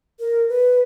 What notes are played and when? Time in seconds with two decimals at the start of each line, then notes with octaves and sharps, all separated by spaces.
0.20 A#4
0.49 B4